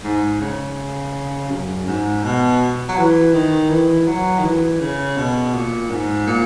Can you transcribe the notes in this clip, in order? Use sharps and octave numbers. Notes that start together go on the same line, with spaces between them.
G#2
C#3
F#2
G#2
B2
F#3
E3
D#3
E3
F#3
D#3
E3
C#3
B2
A#2
G#2
A#2